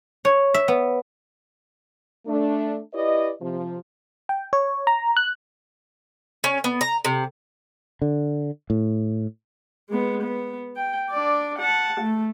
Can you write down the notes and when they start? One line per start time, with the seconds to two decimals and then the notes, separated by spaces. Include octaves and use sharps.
0.25 C#5
0.54 E5
0.68 B3
2.26 A3 D4
2.94 E4 G4 B4 D5 D#5
3.42 C3 F3
4.29 G5
4.53 C#5
4.87 A#5
5.17 F#6
6.44 C#4
6.64 B3
6.81 A#5
7.05 C3
8.02 D3
8.70 A2
9.90 G#3 B3
10.22 B3
10.76 G5
11.10 D4 D5
11.59 F#5 A5
12.01 A3